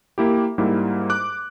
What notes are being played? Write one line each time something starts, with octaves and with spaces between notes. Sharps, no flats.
A#3 E4 G4
G#2 G3 A#3 E4
D6 F#6